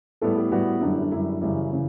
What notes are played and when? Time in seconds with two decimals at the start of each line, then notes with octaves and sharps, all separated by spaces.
0.21 A2 G3 B3 A4
0.37 G4
0.52 A2 G3 B3 F#4
0.81 F#2 D3 G3 D4
0.92 E4
1.02 D4
1.12 F#2 D3 G3 E4
1.41 F#2 C#3 E3 G3 E4
1.73 C#3 E3